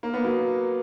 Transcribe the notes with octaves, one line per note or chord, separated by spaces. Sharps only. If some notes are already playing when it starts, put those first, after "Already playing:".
A#3
B3
F#3 A#3